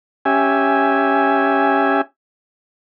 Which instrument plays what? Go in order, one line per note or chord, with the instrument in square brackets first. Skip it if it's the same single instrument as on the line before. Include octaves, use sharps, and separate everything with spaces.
[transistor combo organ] C#4 G4 E5 G#5